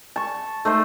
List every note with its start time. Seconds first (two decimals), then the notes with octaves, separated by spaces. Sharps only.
0.16 A5 C#6
0.65 A3 D#4 C5